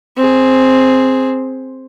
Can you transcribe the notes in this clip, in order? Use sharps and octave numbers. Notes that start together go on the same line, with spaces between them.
C4 G#4